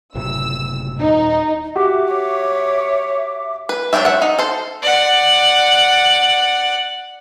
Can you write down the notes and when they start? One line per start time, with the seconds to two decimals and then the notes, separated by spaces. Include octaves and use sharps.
0.15 F#1 A2 C3 E6
1.00 D#1 D#4
1.76 F#4 G4 E5 D6
2.13 C#5
3.69 B4
3.93 F#3 G#3 D4 G4 E5
4.05 E5 F#5
4.22 D#4
4.39 A4 C5
4.82 D5 F#5